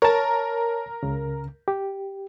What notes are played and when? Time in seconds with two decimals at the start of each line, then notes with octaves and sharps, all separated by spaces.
0.02 A#4 C#5 A5
1.03 C#2 C#3
1.68 G4